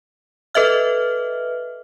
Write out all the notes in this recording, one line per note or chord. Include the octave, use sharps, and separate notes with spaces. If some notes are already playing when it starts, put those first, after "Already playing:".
A4 B4 D#5 E5 F6